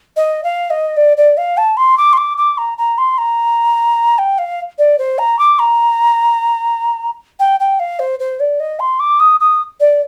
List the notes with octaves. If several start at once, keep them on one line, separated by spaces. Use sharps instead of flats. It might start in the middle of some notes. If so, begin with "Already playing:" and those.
D#5
F5
D#5
D5
D5
F5
A5
C6
D6
C6
D6
D6
A#5
A#5
C6
A#5
G5
F5
D5
C5
A#5
D6
A#5
G5
G5
F5
C5
C5
D5
D#5
C6
D6
D#6
D#6
D5